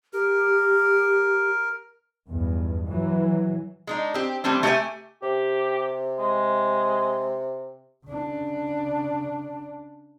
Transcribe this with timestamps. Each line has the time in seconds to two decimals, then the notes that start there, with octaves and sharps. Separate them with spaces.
0.13 G4 A#4
2.27 B1 E2 G2
2.86 E3 F#3
3.87 G#3 D4 D#4
4.14 C4 G4
4.44 E3 G3 A3 C4 D4
4.63 A3 G4 C#5 D5 E5 G#5
5.23 C3 G4
6.19 G#3
8.06 C#3 D4